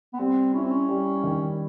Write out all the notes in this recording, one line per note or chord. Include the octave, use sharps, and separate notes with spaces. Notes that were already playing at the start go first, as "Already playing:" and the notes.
B3
G3 C4
C#4 E4
C4
C#4
G3
D#3